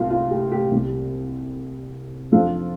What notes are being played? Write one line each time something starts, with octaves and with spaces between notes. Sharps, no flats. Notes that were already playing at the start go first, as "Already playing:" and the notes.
Already playing: C2 F4
F4
G4
G4
C2 C3 G3
F2 F3 D4 F4 A4